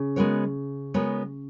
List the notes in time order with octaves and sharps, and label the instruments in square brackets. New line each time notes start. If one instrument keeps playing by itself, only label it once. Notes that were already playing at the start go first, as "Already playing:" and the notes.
Already playing: [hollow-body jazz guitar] C#3
[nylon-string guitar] G#3 B3 F#4 A#4 C#5
G#3 B3 F#4 A#4 C#5